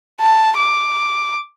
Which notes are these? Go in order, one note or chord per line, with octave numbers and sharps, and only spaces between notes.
A5
D6